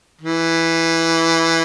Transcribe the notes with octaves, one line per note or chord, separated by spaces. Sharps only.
E3